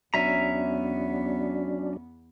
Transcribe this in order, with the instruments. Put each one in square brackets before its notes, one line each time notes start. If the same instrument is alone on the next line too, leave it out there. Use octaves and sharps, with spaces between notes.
[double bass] E2 B3 [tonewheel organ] F#3 D4 [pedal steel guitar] C#4 E5 A#5